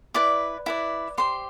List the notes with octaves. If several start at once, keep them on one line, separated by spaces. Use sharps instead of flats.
E4 B4 D5 D6
E4 B4 D5
G4 C5 C6